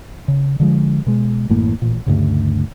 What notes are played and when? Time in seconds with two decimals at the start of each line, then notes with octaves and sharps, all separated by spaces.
0.28 C#3
0.60 D3 F3 G#3
1.07 B2 G#3
1.49 A1 F#2 A2 A#3
1.82 A1 A#2
2.06 D2 G2 C#3